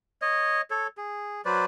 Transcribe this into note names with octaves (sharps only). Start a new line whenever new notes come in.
C#5 D#5
A4 C#5
G#4
F#3 B4 C5 D5